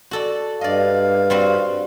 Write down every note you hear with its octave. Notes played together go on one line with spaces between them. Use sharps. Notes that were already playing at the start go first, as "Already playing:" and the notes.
F#4 A4 D5
G2 D5 D#5 F5
G3 C4 F#4